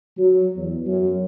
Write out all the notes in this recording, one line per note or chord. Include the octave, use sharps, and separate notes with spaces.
F#3
E2
F#2